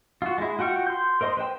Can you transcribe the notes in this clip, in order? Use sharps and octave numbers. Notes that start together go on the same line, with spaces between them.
F4 F#4
G#3 E4
F4 F#4 G5 C#6 F6
C6 G6
A#4 C5 D#5 C6
B4 C5 G5